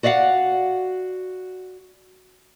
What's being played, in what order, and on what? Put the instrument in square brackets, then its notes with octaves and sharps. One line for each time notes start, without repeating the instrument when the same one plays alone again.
[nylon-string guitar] F#4 D5 D#5 F5 F#5